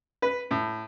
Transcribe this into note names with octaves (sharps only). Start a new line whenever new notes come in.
B4
A2